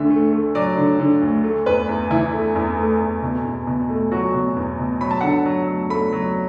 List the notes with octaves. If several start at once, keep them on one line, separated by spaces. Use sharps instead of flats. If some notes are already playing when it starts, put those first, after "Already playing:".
Already playing: D2 D3 E5
A3
A3
F#3 D5
D3
D3
D2
A3
E2 B4
E2
E3 E4
A3
E2
A3
E2
B2
E2
B2
A3
F#3 F#4
B2
E2
B2
F#3 B5
A5
D3 F#5
A5
F#3
F#3
A3 B5
F#3